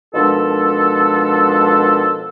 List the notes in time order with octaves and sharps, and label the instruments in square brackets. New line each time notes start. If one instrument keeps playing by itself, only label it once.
[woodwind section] B2 D#3 F3 G#3 D4 A4